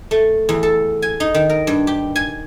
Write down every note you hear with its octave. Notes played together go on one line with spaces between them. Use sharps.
A3
E2
A4
G#5
D#4
D#3
A#4
G2
G4
G#5